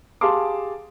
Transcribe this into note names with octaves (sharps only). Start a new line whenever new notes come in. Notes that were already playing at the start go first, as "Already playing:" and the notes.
G4 G#4 F5 A5 C6 D6